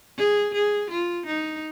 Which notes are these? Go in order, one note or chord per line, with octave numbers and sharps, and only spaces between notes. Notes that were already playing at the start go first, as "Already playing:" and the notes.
G#4
G#4
F4
D#4